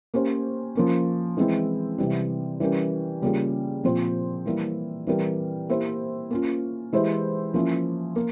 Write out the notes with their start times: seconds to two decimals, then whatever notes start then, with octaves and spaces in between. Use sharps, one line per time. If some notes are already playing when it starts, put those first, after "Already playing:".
0.14 A#3 C#4 G4 C5
0.75 F3 A#3 C#4
1.37 E3 G#3 C4 E4
1.98 C3 E3 G3
2.60 E3 G3 C#4 G4 A#4
3.22 C#3 G3 A#3 F4 G#4
3.84 A#2 F3 C4 F4 C5
4.46 E3 G3 A#3 E4
5.07 E3 G3 C4 G4 A#4
5.69 A#3 E4 G4 C5
6.31 A#3 C#4 F4
6.93 E3 G#3 E4 G4 C5
7.54 F3 A#3 C#4 E4
8.16 A#3